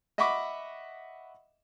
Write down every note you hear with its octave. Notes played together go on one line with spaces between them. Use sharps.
D#5 E5 F#5 B5 C#6 D6